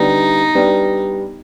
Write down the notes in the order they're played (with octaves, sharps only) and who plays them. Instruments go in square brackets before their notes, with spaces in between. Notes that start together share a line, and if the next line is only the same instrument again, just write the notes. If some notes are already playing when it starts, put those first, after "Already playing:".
Already playing: [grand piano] D3 G3 B3 [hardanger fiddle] D#4
[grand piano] G3 B3 D4